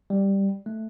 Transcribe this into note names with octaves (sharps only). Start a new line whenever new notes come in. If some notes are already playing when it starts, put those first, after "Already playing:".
G3
A3